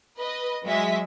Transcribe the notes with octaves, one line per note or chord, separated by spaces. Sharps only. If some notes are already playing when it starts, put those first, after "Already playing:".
B4 D#5
F#3 G#3 E5 B6